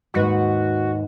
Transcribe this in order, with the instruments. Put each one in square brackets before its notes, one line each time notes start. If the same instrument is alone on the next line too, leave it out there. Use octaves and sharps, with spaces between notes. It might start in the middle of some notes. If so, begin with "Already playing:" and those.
[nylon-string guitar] D#2 G#2 B4 [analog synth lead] F#4